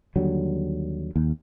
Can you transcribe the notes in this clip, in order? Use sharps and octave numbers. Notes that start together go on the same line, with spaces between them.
D#2 D3 F#3 G3
D#2